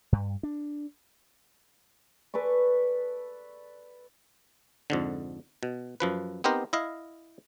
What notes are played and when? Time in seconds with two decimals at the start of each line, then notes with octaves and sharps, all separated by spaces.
0.12 G2
0.43 D4
2.34 A4 B4 D5 C#6
4.90 F2 G#2 D3
5.63 B2
6.00 F#2 F3 B4
6.44 B3 C4 D#4 G4 A#4 C5
6.73 E4 D#5 F5